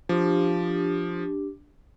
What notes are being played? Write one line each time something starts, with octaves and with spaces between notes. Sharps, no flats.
F3 D4 G4